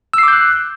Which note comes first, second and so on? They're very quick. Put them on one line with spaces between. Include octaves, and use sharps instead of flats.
E6 C7 D6 G6 F#6